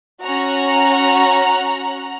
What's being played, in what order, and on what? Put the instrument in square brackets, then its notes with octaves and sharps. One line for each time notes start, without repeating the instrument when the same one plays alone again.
[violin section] C#4 F#4 F#5 A#5